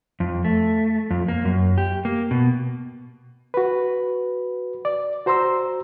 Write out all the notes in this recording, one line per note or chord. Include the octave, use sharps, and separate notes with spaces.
F2
A3
F2
A#3
F#2
G4
A#3
B2
F#4 B4
D5
F#4 C5 A#5 C6 E6